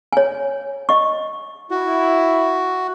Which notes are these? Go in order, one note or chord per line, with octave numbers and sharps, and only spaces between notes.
C#5 G#5
D#5 C#6
E4 F#4